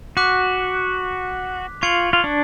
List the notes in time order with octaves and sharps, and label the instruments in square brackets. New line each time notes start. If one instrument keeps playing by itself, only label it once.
[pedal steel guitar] F#4 [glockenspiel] D6 F#6 B6
[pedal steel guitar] F4 [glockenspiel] C#6 G#6 C#7 F#7
[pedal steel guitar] F4
D4